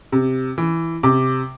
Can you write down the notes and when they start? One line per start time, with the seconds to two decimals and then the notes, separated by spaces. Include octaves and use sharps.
0.12 C3
0.58 E3
1.03 C3 D6